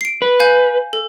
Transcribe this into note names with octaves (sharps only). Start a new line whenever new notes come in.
C7 D7
B4
F5 G#5 G6
A4